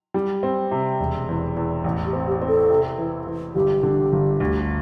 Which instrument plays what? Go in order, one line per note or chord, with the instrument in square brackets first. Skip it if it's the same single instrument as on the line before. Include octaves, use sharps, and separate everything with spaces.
[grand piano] G3
C4
C3
E1
E2
E2
A1
[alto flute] G4
[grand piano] C4
[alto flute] G4
[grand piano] C4
[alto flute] A4
[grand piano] C3
E3
E3
[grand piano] G1 [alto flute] G4
[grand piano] D3
G1
D2